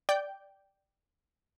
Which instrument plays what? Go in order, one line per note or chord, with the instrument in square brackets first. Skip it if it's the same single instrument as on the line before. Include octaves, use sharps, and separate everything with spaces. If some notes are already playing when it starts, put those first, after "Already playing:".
[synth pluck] D5 G5 G6